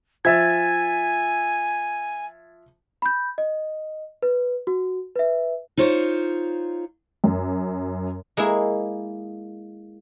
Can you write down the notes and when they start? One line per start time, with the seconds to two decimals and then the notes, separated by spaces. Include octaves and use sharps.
0.25 F3 E5 G#5 G#6 A6
3.02 B5 G6
3.38 D#5
4.22 B4
4.67 F#4
5.15 B4 E5
5.77 D#4 F4 C5 C#5
7.24 F#2
8.37 G#3 A#3 E4 G#4